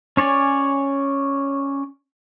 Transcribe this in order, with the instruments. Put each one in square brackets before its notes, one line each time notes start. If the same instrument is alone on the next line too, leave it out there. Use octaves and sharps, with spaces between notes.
[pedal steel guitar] C#4 C#5 D5 G#5